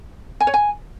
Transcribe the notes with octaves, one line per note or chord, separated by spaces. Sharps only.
G#5
C#5
G#5